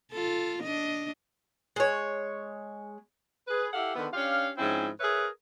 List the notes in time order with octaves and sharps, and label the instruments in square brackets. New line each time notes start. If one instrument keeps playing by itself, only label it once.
[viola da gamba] F4 A4
D4 D#5
[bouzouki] G#3 C#5
[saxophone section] G#4 B4
E4 G4 A4 F5 F#5
D3 D#3 B3
C#4 D4 G4 F5
G#2 F3 C4 C#4 E4
G#4 A#4 B4 C#5 E5